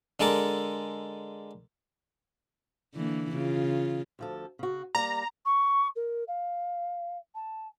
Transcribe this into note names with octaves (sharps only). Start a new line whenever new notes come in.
D3 G#3 A4 A#4 D6
D3 E3 A#3
C#3 F4
D2 F3 A4
C#3 F#4
G3 A#3 D5 A#5
C#6
A#4
F5
A5